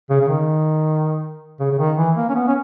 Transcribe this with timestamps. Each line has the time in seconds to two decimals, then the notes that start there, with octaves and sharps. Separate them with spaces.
0.10 C#3
0.21 C#3
0.28 D#3
1.60 C#3
1.71 C#3
1.78 D#3
1.97 E3
2.16 A#3
2.29 C#4
2.35 B3
2.47 C#4